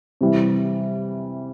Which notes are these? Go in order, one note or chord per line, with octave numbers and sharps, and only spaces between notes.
C3 E3 G3